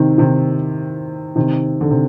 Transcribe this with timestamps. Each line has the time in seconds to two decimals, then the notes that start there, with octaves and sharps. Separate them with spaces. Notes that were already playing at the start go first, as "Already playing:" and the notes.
Already playing: C3 D#3
0.18 C3 D#3
1.36 C3 D#3
1.81 D3
1.91 C3